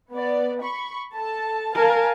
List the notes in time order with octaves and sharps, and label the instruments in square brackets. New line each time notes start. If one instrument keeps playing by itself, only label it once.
[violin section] B3 D5
B5 C#6
A4 A5
[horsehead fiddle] A#4 [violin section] F5 G#5 A5